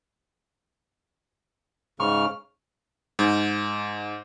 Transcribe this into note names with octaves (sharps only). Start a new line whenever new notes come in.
G#2 C#3 C#6 F6
G#2